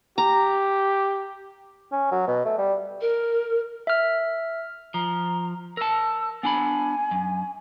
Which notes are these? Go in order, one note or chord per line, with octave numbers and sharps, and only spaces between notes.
G4 A#5
C#4
F#3
B2
A3
G3
A#4
E5 F6
F3 A#5
A#4 A5 E6
B3 D4 G#5 B5
F#2